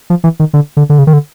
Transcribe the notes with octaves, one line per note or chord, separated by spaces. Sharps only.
F3
E3
D#3
D3
D3
D3
C#3
D#3
D3